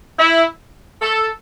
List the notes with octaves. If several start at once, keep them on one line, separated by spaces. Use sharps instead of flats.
E4
A4